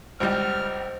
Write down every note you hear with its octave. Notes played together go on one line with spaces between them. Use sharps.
G#1 C#2 G3 C5 D#5 F6